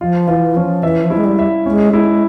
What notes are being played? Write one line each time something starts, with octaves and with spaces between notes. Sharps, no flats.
F3 F4
E3 F4
F3 C#4
E3 E5
F3
E4
G#3
G3
E5
G#3 C#4
G#3 E4